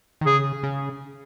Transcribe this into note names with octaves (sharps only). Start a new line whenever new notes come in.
D#3
C#3 G#4
C#3